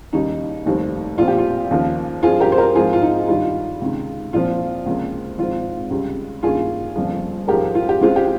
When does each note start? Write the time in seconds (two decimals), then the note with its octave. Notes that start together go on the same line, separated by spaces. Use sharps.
0.13 D#2 C#3 G3 C#4 D#4
0.66 F1 D#2 D#3 G3 C4
1.18 A#1 A#2 F3 C4 F4
1.28 G4
1.38 F4
1.71 D#2 C#3 F3 A#3
2.23 G2 F3 C4 F4 G#4
2.40 G4 A#4
2.52 C5
2.58 G4 A#4
2.75 G#2 F3 C4 F4 G#4
2.93 F4
3.02 D#4
3.28 G2 D#3 G3 F4
3.81 C#2 C3 D#3
4.33 A#1 A#2 F3 C4 F4
4.86 C#2 C3 F3 A#3
5.38 G#1 G#2 F3 C4 F4
5.90 C#2 C3 G3 C#4
6.43 G2 D#3 A#3 C#4 F4 G#4
6.96 G1 F2 C#3 F3 A#3
7.48 G#2 F3 G#3 G4 A#4
7.75 F4
7.89 G4
8.01 C#2 C#3 G#3 C4 F4
8.16 G4